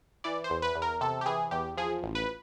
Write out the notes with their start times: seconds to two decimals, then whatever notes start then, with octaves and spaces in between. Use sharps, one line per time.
0.24 E3 D5
0.44 C5
0.50 E2
0.62 B4
0.76 E2
0.82 A#4
1.01 C3 A4
1.21 G4
1.26 E3 G#4
1.51 E2 G4
1.77 F3 G#4
2.03 A1
2.15 B4